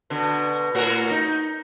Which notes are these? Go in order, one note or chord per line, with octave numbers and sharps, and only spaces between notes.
B2 D3
A2 F#4 A#4
D#4